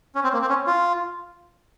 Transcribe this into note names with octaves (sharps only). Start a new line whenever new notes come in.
C#4
C4
A#3
C4
C#4
F4